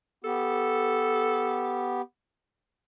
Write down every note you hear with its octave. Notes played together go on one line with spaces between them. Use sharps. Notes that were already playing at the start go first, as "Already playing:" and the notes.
B3 G4 A4